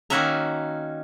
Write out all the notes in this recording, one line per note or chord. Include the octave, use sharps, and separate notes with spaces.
D#3 A#3 C#4 F#4 E5 A#5